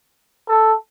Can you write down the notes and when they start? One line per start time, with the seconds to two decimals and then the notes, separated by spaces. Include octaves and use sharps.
0.48 A4